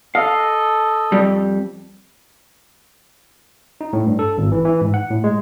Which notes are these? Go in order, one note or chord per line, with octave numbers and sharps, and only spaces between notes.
A4 D#5 F5
F2 G3
D#4
A2
G2
A4
G#1
E3
E3
G#2
F#5
A2
G#3